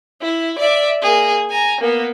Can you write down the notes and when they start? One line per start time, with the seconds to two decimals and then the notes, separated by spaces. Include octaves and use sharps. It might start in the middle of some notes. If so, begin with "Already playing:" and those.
0.22 E4
0.59 D5 E5
1.02 A#3 G#4
1.50 G#5 A#5
1.81 A#3 B3